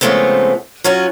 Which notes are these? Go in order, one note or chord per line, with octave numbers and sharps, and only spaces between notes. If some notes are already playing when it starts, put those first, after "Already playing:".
C#3 F3 G#3 A3 B3 C4
F#3 C#4 F4 F#4